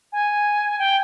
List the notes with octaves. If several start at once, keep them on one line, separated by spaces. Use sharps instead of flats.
G#5
G5